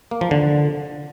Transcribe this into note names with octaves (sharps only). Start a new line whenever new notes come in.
A#3
F3
D3